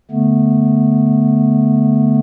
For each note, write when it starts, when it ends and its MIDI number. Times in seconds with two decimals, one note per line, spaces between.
0.11 2.20 50
0.11 2.20 57
0.11 2.20 59